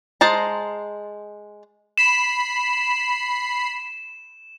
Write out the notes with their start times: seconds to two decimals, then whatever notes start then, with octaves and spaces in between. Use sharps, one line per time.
0.21 G#3 C5 A5 A#5
1.98 B5 C7 E7